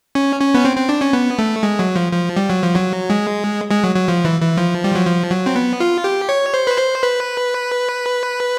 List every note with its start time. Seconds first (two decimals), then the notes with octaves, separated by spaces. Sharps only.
0.15 C#4
0.40 C#4
0.54 B3
0.65 C4
0.76 C4
0.89 D4
1.01 C#4
1.13 B3
1.39 A3
1.63 G#3
1.79 F#3
1.96 F3
2.12 F3
2.36 G3
2.50 F#3
2.62 F3
2.76 F#3
3.10 G#3
3.71 G#3
3.84 F#3
3.96 F#3
4.08 F3
4.25 E3
4.41 E3
4.57 F3
4.84 G3
4.95 F#3
5.06 F3
5.30 F#3
5.46 C4
5.56 B3
5.80 F4
6.04 G4
6.29 C#5
6.54 C5
6.67 B4
6.78 C5
7.03 B4